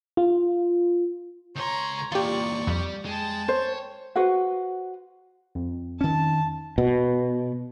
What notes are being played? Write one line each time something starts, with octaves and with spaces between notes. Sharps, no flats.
F4
C#2 C#5 A#5 C6
E2 A#2 F4 G4 D5 C#6
F2 G3
G#3 G5 A5
C5 C#5
F#4 B4 C5 F#5
F2
D#3 C#4 A5
B2